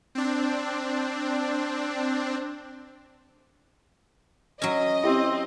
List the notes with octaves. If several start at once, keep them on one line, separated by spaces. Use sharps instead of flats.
C4 D4
F#3 C#4 D#5 A#6
C4 E4 G4